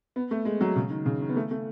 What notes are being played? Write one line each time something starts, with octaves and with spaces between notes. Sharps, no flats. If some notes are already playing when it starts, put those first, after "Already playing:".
B3
A3
G#3
F#3
C#3
D#3
C#3
D#3
B3
A3
A3